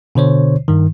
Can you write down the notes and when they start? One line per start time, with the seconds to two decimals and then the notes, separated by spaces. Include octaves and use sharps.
0.15 B2 D3 C5 C#5
0.68 G2 D#3